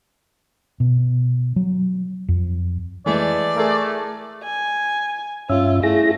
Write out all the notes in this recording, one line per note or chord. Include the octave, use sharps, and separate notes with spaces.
B2
F#3
F2
E3 G#3 A3 D5
A3 G#4 A#4
G#5
G2 C#4 F4 E5
A3 E4 G#4 A#6